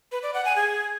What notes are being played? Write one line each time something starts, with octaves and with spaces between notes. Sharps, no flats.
B4
D5
F#5
G#5
G#4